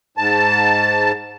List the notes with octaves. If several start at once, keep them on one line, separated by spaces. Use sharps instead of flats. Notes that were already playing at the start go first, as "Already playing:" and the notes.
G#2 A5